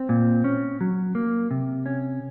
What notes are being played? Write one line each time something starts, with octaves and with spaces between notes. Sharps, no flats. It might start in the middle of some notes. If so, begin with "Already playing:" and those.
Already playing: C4
A#2
C#4
F#3
A#3
C3
C#4